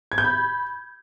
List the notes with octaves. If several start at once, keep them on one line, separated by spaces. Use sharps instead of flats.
G#6
G6
B5